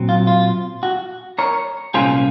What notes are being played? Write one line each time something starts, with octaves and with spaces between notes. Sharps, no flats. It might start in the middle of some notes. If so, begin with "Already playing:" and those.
Already playing: A#2 F#3 C4
F4
F4
F#4
A#4 C#5
C2 A#2 G#3 C#4 F4 G#4 C5